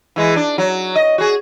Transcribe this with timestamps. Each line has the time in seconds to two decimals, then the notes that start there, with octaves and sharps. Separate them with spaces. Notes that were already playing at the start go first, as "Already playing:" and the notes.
0.16 E3 G#3
0.36 D4
0.58 F#3
0.96 D#5
1.18 F#4 G#4